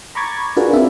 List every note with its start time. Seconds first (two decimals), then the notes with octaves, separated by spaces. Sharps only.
0.15 A#5 B5 C#6 D6 G#6 A6
0.57 D4 F4 F#4 G#4 A#4 B4
0.73 C4 D4 F4 E5